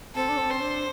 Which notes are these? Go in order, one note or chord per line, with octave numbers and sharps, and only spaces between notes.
C4 A4
D4
C4
C5
D4